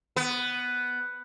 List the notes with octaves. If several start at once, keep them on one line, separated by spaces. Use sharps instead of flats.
B3